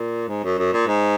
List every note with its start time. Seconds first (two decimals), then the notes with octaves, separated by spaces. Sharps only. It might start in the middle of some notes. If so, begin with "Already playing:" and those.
Already playing: A#2
0.28 G#2
0.44 F#2
0.59 F#2
0.73 A#2
0.87 G#2